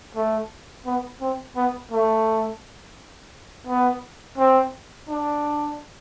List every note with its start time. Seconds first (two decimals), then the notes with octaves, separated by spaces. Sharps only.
0.15 A3
0.86 B3
1.21 C4
1.56 B3
1.91 A3
3.67 B3
4.38 C4
5.08 D4